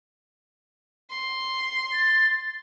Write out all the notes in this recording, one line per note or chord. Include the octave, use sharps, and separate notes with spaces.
C6
A6